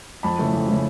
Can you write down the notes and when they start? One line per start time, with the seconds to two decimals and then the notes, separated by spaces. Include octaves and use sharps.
0.23 F2 A5 B5
0.39 C#3 E3 A3
0.53 F2
0.68 C#3 E3 A3